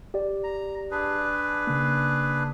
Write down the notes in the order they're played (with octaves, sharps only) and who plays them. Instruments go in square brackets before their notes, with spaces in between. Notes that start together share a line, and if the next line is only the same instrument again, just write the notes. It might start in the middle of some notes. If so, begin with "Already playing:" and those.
[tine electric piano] G4 D5
[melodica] A#5
D4 G#4 B4
[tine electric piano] C#3 A#3